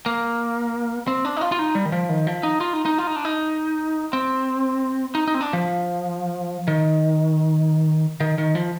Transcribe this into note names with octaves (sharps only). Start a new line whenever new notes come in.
A#3
C4
D4
D#4
F4
F4
D#4
G3
D#3
F3
D#3
F3
D#4
F4
D#4
D#4
F4
D#4
D4
D#4
C4
D#4
D#4
C4
D4
F3
D#3
D#3
D#3
F3